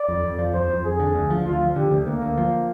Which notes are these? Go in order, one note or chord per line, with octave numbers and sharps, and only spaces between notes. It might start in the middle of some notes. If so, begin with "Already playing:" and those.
Already playing: D5
F2
F2
F3
F2 C5
F2
F2 G#4
D3
D2
F3
D2 F4
F3
D3 G4
D2
D2 A#3
D2
F3